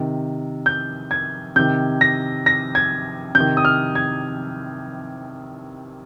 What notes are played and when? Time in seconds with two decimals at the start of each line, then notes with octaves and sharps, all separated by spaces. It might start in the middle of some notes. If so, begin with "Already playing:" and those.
Already playing: C3 D#3
0.66 G6
1.11 G#6
1.56 C3 D#3 G6
2.01 A#6
2.46 A#6
2.75 G#6
3.35 C3 G6
3.40 D#3
3.57 D#6
3.65 F6
3.95 G#6